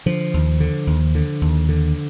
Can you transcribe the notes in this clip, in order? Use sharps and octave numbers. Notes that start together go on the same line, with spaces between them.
D3 F3
D#2
D3
D#2
D3
D#2
D3